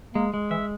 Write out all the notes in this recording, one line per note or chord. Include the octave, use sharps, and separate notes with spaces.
G#3 A#3
G#3
E3 E5